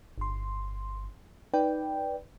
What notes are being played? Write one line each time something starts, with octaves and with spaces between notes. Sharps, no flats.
G1 C6
D#4 B4 D5 G5